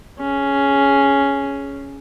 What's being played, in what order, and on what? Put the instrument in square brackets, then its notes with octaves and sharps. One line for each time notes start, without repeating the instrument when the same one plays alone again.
[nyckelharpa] C#4 G#4